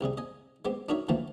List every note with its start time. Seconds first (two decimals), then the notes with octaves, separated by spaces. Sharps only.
0.01 C2 C3 G3 G#4
0.17 D#5 G#5
0.65 G#3 B3 C4 G4
0.89 D4 D#4 F#4 A#4 C#5 E5
1.09 D2 E3 F3 A3 A#3 A5